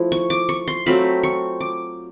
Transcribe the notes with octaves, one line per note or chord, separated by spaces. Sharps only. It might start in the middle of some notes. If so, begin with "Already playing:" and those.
Already playing: F3 A3 E4
C#6
D6
C#6
C6
F#3 A3 C4 F4 B5
C#6
D6